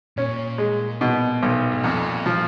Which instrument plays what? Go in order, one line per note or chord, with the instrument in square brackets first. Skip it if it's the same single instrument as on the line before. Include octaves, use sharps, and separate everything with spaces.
[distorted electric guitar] A#2 [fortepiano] C#4
[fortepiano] G#3
B2
B1
[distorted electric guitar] G#2
[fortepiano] F2 [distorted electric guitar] A#2
[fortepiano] F3